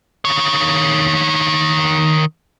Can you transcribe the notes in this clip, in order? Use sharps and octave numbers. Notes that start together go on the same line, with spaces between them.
D#3 C#5